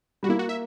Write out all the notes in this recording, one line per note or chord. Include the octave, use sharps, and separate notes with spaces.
G3 F#4
A#3 E4
F#4
E5